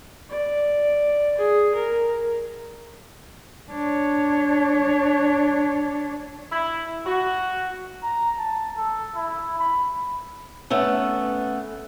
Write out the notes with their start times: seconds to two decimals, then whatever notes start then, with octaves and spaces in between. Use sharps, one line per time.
0.29 D5
1.37 G#4
1.74 A#4
3.71 D4 C#5
6.51 E4
7.06 F#4
8.03 A#5
8.38 A5
8.78 A4
9.16 E4
9.59 B5
10.70 A3 B3 C#4 A4